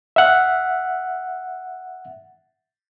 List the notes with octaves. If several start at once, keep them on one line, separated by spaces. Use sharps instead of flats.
E5 F#5